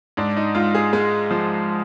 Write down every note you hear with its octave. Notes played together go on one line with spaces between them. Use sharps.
G#2 D4
D#4
G#2 F4
G#4
G#3
F3